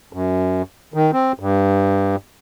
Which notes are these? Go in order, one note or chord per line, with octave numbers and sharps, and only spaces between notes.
F#2
D#3
C4
G2